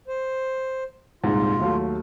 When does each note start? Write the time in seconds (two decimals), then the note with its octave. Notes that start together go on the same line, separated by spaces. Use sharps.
0.08 C5
1.24 D#1 C2 G#2 F4
1.60 D#2 F#3 A3